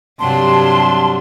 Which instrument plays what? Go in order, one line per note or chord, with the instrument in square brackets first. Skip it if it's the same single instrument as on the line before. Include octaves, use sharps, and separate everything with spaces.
[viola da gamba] G2 C3 F#3 [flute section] A5 C6